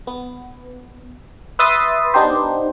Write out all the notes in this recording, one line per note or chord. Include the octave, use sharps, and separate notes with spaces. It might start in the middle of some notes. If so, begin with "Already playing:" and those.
B3
B4 E5 C6 D#6 A6 B6
B3 D4 D#4 G4 C5